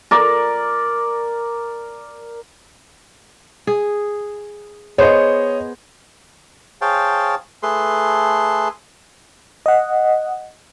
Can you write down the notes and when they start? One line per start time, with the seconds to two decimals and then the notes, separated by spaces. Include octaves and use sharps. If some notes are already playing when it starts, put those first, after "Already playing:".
0.11 A#4 D5
3.67 G#4
4.98 B3 G#4 C5 C#5 D#5
6.81 G#4 C5 C#5 F5 G5 A5
7.63 A3 G#4 A4 B4 C6
9.66 D#5 F#5